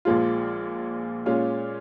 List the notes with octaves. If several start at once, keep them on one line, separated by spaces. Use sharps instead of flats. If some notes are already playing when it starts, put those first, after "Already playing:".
A#1 A#2 F3 G#3 F4
A#2 G#3 C#4 F4